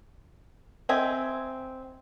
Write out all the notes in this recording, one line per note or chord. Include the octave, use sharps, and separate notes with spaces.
C4 D#5 E5 G#5